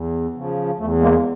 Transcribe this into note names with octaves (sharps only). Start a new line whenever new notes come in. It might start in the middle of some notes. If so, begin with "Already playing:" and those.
Already playing: E2
C#3 F3
E2 A3
G#3 A#3